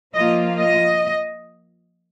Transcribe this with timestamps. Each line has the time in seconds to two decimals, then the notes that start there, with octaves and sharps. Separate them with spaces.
0.15 F3 A#3 F4 D#5
0.59 D#5